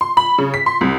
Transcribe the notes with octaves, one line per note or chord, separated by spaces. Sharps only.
C6
B5
C#3
B6
C6
C2